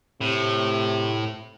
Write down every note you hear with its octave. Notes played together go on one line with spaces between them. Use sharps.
A2 C3